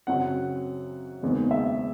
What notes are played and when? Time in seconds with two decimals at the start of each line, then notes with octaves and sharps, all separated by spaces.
0.07 F#2 C#3 F#3 C4 F#5
1.22 F#1 E2 D#3 G#3 C4
1.51 E5